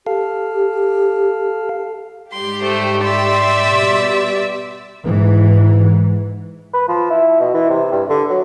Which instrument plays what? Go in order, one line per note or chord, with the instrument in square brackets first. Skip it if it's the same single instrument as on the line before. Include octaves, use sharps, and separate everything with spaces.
[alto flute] G4 [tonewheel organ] A4 F5
[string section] G#2 G3 G4 [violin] C6
[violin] A3 C5
[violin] D5 E5 [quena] C6
[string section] B2 G3
[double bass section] G#2 E3
[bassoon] B4
F3
E4
B2
E3
C3
G2
D3
F#3